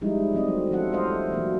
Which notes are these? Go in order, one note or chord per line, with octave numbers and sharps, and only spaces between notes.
F3 G3 G#3 D#4 E4
F3 F#3 C4 D#5
A3
F3 C#4 F4 A4 F#5
G3 A3 A4 C5 D#5 F5
E3 F#3 A#3